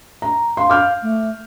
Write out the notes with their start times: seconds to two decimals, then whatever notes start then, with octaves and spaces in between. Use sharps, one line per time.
0.22 A#5
0.57 F5 C6
0.70 D6 F6 G6
1.02 A3